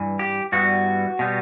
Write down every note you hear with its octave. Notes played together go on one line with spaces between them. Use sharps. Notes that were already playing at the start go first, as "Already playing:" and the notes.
Already playing: G2 E3
G4
G2 E3 G3 B3 F#4
B2 G3 B3